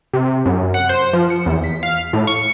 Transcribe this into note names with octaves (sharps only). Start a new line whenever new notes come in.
C3
F#2
F#5
C5
F3
C#7
E2
B6
F5
A2
C#6